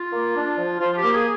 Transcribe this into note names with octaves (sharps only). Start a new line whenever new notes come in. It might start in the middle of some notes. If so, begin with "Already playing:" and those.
Already playing: F4
A#3
D4
F3
F3 F4
F4
G4
A#3
G#4